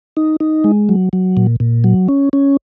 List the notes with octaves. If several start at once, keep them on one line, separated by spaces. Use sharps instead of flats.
D#4
D#4
G#3
F#3
F#3
A#2
A#2
F#3
C#4
C#4